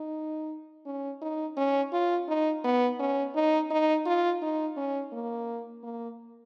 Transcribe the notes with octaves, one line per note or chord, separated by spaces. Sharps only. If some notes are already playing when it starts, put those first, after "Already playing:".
Already playing: D#4
C#4
D#4
C#4
F4
D#4
B3
C#4
D#4
D#4
F4
D#4
C#4
A#3
A#3